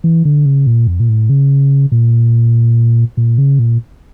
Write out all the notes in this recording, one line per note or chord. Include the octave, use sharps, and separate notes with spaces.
E3
D3
C#3
A#2
F2
A#2
A2
C#3
A#2
A#2
C#3
A#2